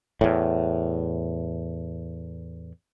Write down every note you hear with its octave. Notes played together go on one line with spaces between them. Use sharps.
E2 A2